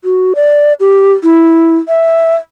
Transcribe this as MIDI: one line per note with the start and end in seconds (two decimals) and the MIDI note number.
0.04 0.33 66
0.35 0.73 74
0.80 1.13 67
1.23 1.77 64
1.88 2.35 76